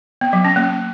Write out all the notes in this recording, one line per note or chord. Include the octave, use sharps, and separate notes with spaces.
B3
F#3
C#4
A#3